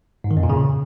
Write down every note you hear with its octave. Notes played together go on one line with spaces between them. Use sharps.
G#2
D#3
F2
A#2
C#3